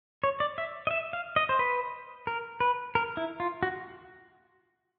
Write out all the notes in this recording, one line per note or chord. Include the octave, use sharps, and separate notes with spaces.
C#5
D5
E5
D#5
E5
F5
D#5
C5
B4
A#4
B4
A#4
E4
F4
F#4